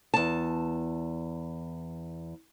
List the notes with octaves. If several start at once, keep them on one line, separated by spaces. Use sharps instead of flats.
E2 A5